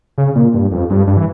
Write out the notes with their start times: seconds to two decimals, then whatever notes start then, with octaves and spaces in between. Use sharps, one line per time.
0.18 C#3
0.36 A#2
0.54 G2
0.72 F2
0.90 G2
1.07 G2
1.17 E3